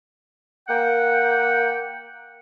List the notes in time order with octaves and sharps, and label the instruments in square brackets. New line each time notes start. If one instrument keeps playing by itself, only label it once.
[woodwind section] A#3 F#5 G5